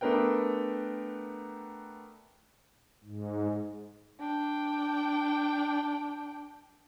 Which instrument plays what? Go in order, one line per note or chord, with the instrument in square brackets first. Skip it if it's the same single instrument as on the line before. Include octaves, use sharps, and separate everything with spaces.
[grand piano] A3 B3 D4 A#4 B4 G5
[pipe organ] G#2
[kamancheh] D4 G5